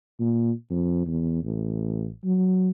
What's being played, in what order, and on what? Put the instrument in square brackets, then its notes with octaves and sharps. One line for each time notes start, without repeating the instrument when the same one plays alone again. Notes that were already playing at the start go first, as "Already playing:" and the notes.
[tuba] A#2
F2
E2
A1
F#3